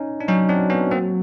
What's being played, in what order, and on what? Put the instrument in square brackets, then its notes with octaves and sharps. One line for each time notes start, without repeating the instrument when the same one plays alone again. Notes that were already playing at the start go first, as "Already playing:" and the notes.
Already playing: [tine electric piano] C#4 D#4
D4
[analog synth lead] F#3 [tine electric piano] C#4 D#4
[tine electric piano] C4 D4
B3 C#4
A#3 C4